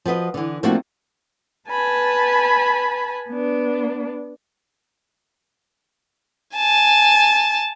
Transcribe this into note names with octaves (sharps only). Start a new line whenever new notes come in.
F3 F#4 B4 D#5
D3 E3
F3 A3 A#3 C4 D4 F#4
B4 G#5 A5 B5
B3 D4
G#5 A5